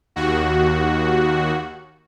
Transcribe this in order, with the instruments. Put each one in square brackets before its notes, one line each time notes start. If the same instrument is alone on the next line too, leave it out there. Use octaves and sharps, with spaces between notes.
[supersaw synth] D#2 F#4